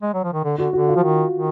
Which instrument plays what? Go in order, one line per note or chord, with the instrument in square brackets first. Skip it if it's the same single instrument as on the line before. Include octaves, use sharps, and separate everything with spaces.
[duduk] G#3
F#3
F3
D#3
D3
[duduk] D3 [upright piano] F#4
[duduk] D3 [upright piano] F#4
[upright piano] F4
[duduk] F3
D#3
D#3